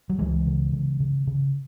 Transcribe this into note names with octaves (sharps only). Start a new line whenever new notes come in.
F#3
C#2 E3 G#3
C#3
C#3
C#3
C#3